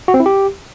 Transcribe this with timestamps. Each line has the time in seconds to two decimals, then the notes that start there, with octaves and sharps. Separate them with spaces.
0.08 F#4
0.14 C4
0.20 E4
0.26 G4